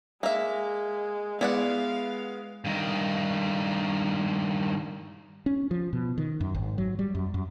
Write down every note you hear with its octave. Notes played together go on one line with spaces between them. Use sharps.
G#3 A#3 E5
G#3 B3 E4 D5 F5 F#5
G2 D#3
C#4
F3
B2
D#3
F#2
G#1
F#3
G3
F#2
F#2